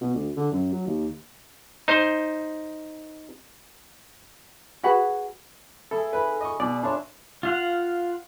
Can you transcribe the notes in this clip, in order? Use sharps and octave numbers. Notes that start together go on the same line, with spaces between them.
B2
D2
D3
F#2
F#3
D#2
D#4 C5
F#4 G#4 B4 F#5
E4 G#4 A4
D#3 B4 B5
D#5 C#6
B2 D5
D4 E4 F4 A4 C#5 A5
F4 F5 F#5